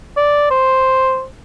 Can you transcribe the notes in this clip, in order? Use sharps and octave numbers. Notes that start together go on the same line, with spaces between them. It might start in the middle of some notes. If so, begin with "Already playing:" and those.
D5
C5